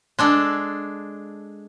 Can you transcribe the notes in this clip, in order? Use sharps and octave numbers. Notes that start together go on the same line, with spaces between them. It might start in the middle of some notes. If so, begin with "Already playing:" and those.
G#3 D4 A4